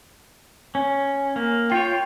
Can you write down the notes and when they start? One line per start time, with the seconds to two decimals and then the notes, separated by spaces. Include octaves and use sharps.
0.75 C#4
1.36 A#3
1.72 F4 C#5 G5